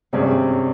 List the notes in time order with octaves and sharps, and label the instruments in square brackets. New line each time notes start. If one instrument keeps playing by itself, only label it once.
[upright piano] G#1 G2 G3 C#4 G#4 [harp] C3